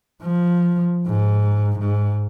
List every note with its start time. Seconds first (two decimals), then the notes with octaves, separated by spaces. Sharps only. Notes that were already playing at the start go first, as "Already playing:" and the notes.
0.23 F3
1.07 G#2
1.79 G#2